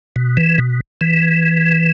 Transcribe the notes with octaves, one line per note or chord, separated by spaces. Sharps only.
B2
E3
B2
E3